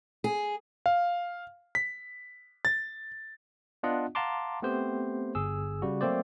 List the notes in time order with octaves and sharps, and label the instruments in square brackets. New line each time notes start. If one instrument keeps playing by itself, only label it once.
[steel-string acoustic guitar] G#4
[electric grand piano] F5
B6
A6
[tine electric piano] B3 D4 F4 D#5 F#5
F5 F#5 A5 A#5 C6 D6
A3 B3 C4 G4 C5
G1 G#4 E6
C#3 G3 F#4
F#3 A3 A#3 C4 C5 D5